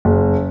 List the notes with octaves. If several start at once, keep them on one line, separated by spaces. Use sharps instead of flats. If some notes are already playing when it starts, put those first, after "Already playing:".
F#1